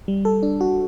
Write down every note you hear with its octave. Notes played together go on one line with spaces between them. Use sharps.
G3
A4
D4
F#4